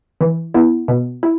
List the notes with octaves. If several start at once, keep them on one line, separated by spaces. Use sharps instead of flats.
E3
B3 E4
B2
E4